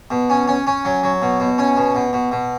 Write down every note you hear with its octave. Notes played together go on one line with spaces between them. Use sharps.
B2
C#4
C#4
C#4
F#3
F#3
B2
B2
C#4
B2
B2
B2
B2